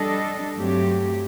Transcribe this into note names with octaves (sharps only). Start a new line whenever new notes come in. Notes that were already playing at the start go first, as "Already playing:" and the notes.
Already playing: G3 D4 A4 D#5
G2 F#3 A3 C4 G4